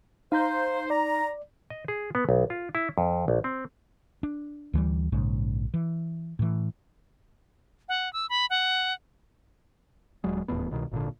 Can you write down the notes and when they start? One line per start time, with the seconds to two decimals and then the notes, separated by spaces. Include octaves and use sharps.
0.32 D#4 C5 F5 A#5 G6
0.90 D5 A#5
1.70 D#5
1.88 G#4
2.15 B3
2.29 B1
2.50 F4
2.75 E4
2.98 F2
3.28 A#1
3.44 C4
4.23 D4
4.73 D2 E3 F3 G3
5.12 A#1 G#2 C#3
5.74 E3
6.39 A2 E3
7.89 F#5
8.13 E6
8.30 B5
8.50 F#5
10.24 D#1 F#3 G#3
10.48 D#1 E2 A2 B3
10.71 C2 B2 D#3
10.92 G#1 A#2 D3